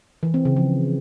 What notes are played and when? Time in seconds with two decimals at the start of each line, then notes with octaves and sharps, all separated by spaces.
0.23 E3
0.34 C4
0.45 C#3
0.57 F3